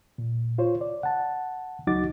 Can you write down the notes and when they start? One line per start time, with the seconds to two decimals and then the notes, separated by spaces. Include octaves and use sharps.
0.18 A#2
0.58 F4 C5 C#5
0.81 D5
1.03 F#5 A5
1.87 C#2 F#3 D#4 F#4 D6 A6